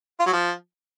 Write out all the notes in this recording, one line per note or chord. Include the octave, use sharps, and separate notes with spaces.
F4
F#3
F3